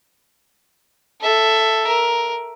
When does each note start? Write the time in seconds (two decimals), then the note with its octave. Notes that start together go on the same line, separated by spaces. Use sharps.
1.21 A4 E5
1.87 A#4